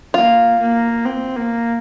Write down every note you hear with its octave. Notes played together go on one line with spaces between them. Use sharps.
A#3 F4
A#3
C4
A#3